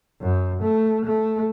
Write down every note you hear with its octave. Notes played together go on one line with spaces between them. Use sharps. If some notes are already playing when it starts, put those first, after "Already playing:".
F#2
A3
A3